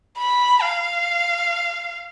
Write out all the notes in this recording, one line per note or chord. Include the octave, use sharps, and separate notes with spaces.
B5
F5